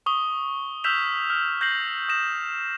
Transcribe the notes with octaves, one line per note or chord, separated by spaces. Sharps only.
C#6 D#6 G7
E6 F6 G6 B6 E7 F7
F6
G6 A#6 C7 F#7
D#6 A#6 E7